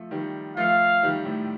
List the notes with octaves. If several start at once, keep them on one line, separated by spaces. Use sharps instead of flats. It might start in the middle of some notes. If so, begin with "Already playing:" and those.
Already playing: F3 A3
D#3 G3
F3 A3 F5
D#3 G3
A2